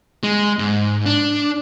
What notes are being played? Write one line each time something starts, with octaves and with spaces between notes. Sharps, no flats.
G#3
G#2
D4